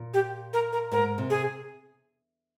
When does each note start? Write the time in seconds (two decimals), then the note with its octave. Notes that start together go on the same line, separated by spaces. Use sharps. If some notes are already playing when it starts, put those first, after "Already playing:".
Already playing: A#2
0.14 G4
0.53 A#4
0.73 A#4
0.91 G#2 A#4
1.18 C3
1.30 G#4